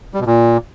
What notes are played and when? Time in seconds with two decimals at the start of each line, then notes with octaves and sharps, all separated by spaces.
0.14 G3
0.20 B2
0.27 A#2